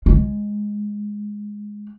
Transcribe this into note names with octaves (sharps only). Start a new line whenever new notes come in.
G#3